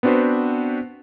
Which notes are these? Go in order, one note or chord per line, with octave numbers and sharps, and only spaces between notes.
B3 C4 D4 F#4 B4 C5